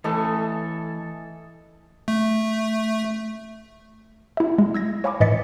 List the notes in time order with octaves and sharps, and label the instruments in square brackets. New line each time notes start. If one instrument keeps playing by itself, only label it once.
[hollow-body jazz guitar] E3 A3 [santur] A4 D#5 G#5
[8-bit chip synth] A3
[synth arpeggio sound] E4 E5
G#3
E6 G#6 A#6
C#5 F5 G#5 B5 C#6 D6
A2 E3 D#5 A6 B6 C#7